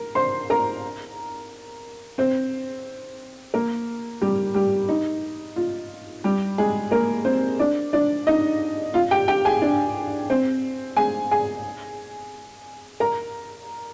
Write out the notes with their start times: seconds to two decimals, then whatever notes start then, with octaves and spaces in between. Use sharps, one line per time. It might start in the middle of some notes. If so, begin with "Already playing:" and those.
Already playing: A#4
0.15 C5 C6
0.50 A#4 A#5
2.18 C4 C5
3.54 A#3 A#4
4.22 G3 G4
4.54 G3 G4
4.89 D#4
5.56 F4
6.24 G3 G4
6.58 G#3 G#4
6.91 A#3 A#4
7.25 C4 C5
7.59 D4 D5
7.93 D4 D5
8.27 D#4 D#5
8.94 F4 F5
9.11 G4 G5
9.28 G4 G5
9.45 G#4 G#5
9.62 D4 D5
10.30 C4 C5
10.97 G#4 G#5
11.31 G#4 G#5
13.00 A#4 A#5